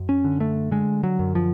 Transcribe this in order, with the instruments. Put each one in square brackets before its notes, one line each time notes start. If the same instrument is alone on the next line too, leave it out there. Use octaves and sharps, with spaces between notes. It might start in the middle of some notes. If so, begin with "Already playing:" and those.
Already playing: [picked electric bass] F#2
C#4
D3
A3
D3 G#3
F#3
F#2
F3